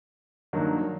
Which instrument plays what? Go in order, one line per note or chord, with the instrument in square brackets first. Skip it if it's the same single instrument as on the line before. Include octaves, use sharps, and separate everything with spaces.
[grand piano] G2 D#3 F#3 A#3